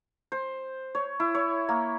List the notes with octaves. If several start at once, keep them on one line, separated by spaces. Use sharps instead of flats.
C5
C#5
E4
C#5
A#3